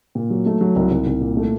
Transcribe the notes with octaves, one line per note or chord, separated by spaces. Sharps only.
A#2
F#3
A3
F#3
C2
C2
C2
A#2
A3